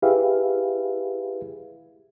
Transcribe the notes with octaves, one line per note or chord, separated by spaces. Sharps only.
E4 G4 G#4 B4 E5 F5